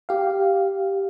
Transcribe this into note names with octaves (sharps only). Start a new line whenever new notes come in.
G4 F5